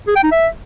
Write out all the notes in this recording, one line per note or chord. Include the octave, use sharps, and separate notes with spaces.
G#4
G5
D#4
E5